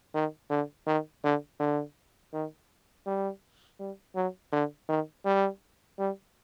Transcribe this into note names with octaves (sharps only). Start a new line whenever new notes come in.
D#3
D3
D#3
D3
D3
D#3
G3
G3
F#3
D3
D#3
G3
G3